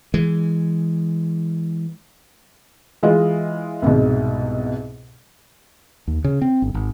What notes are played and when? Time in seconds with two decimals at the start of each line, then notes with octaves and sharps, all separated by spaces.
0.14 E3 G#3
3.03 E3 G#3 F4 D#5
3.82 C2 G#2 B2
6.07 D#2
6.24 C#3
6.42 C4
6.62 G1
6.74 G#1